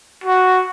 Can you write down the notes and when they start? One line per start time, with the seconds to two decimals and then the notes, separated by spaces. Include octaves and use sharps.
0.24 F#4